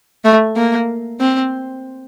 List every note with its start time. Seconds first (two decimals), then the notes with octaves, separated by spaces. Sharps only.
0.25 A3
0.56 A#3
1.20 C4